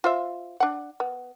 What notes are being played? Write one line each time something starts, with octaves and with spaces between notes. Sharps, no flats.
F4 C5 E5
D4 F#5
B3